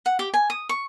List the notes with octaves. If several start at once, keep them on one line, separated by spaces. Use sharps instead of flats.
F#5
G4
G#5
D#6
C#6